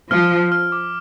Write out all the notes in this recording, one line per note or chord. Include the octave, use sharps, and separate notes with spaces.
F3 F6
F6
F6
D6